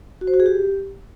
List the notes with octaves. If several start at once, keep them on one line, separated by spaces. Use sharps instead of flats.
F#4
C5
F#4
G#4
G4